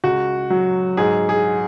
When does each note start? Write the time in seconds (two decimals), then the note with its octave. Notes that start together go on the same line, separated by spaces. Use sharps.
0.04 C#2 F#4
0.50 F#3
0.97 G#2 G#4
1.29 G#4